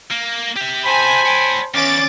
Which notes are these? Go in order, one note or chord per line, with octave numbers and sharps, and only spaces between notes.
A#3
G4 E5
C5 G#5 A5 B5
C#5 G5
E2 C#4 D6 A6